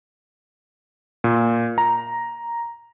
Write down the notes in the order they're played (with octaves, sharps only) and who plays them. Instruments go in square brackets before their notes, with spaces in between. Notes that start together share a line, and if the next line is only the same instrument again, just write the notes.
[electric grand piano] A#2
A#5